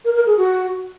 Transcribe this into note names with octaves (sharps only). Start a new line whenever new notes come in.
A#4
A#4
G#4
F#4